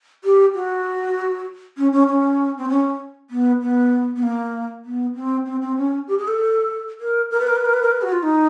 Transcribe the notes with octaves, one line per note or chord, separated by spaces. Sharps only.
G4
F#4
C#4
C#4
C#4
C4
C#4
B3
B3
B3
A#3
B3
C4
C4
C4
C#4
G4
G#4
A4
A#4
A#4
B4
A#4
B4
A#4
B4
A#4
B4
F#4
F4
D#4